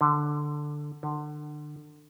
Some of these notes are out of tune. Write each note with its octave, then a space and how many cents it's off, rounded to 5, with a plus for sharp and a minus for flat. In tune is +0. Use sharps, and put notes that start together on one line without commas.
D3 +10
D3 +30